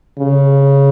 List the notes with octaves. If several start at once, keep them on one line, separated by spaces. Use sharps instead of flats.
C#3